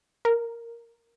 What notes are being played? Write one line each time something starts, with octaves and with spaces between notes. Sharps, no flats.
A#4